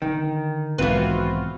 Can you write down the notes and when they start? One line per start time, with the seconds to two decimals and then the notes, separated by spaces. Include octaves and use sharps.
0.02 D3 D#3
0.78 B1 G#2 E3 C4 F4 F#4 B4